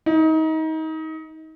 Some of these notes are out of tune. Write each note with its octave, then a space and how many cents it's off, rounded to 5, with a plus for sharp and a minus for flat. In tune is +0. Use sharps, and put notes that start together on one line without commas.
D#4 +30